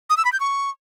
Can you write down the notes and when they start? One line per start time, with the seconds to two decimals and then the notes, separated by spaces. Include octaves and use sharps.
0.10 D#6
0.17 E6
0.25 B5
0.32 G6
0.40 C#6